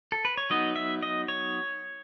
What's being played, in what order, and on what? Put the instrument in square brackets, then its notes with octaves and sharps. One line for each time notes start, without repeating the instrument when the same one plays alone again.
[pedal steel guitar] A4
B4
C#5
F#3 B3 D#4 D#5
E5
D#5
C#5